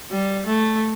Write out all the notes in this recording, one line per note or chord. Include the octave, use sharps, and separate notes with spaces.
G3
A3